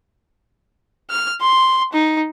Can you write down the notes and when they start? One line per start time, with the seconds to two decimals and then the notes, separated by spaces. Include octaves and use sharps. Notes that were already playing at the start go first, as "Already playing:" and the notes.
1.10 F6
1.42 C6
1.93 D#4